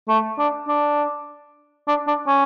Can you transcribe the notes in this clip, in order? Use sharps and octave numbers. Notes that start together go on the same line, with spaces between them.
A3
D4
D4
D4
D4
C#4